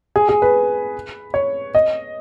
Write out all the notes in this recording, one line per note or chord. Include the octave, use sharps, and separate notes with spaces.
G#4
G#4
B4
C#5
D#5